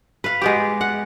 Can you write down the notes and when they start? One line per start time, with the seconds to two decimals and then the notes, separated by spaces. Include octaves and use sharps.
0.24 B4 F5
0.42 G#3 B3 G4
0.81 F#5